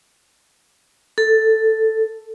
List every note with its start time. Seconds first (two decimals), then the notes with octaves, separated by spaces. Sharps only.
1.18 A4